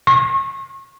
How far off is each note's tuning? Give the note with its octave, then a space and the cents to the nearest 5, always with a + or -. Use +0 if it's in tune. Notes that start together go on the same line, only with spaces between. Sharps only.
C#6 -30